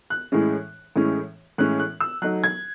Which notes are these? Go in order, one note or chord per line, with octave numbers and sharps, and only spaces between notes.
F#6
A2 E3 G#3 C#4
A2 E3 G#3 C#4
A2 E3 G#3 C#4 F#6
F#6
E6
F#3 A3 D#4 F#6
G#6